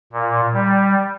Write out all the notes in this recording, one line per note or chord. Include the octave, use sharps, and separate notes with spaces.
A#2
G3